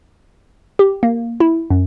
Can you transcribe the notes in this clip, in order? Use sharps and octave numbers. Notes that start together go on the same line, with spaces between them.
G4
A#3
E4
F#2